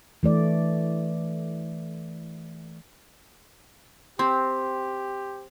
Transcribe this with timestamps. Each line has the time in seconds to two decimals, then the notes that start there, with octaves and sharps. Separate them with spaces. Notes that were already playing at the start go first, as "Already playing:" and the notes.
0.23 E3 A3 D5
4.19 C4 G4 C6